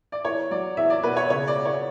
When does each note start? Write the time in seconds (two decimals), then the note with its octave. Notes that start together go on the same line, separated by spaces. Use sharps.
0.12 D5
0.24 E2 C#5
0.51 F#3 D5
0.77 E2 E5
0.90 D5
1.04 B2 B4
1.17 C#5
1.30 C#3 C#5
1.47 D5
1.56 B3
1.65 C#5